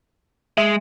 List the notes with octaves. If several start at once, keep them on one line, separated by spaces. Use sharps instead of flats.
G#3 E5